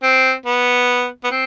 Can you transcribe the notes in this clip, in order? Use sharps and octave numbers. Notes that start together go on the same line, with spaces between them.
C4
B3
B3
C4